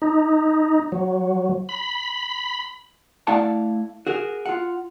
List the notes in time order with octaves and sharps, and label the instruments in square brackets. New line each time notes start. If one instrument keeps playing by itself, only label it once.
[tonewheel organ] D#4
F#3
B5
[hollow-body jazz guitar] A3 E4 D5 F5 F#5 A5
F#4 G#4 A#4
F4 F#5